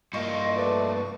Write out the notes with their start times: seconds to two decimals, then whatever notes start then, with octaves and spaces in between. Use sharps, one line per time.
0.13 G2 A#3 F4 D#5 C6 C#6
0.55 A3 B4 D5
0.96 C#6